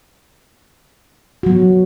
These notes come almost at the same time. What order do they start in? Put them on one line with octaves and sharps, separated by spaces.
F#4 F#3 B3